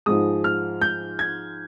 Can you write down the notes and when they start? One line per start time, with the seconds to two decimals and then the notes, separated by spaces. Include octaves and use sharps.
0.06 G#2 F3 G#3 D#6
0.44 F6
0.82 G6
1.19 G#6